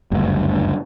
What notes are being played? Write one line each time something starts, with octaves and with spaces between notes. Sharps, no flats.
F#1 D2 G2